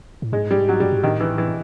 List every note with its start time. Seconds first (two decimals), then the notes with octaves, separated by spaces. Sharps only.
0.22 A2
0.32 G#2 G#3
0.51 G3
0.69 F#3
0.80 G2 G3
0.93 G#2
1.03 A2 D#3
1.21 E3
1.38 E3